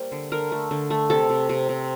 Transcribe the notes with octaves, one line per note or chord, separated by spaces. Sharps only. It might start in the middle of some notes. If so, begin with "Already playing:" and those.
Already playing: G3 A#3 C5
D3
D3 A#4
A3
D3
A3
C3 A4
C3
C3
C3